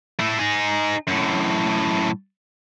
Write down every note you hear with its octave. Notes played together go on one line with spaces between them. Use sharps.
A3 E4
D#4 G#4
F#2 A2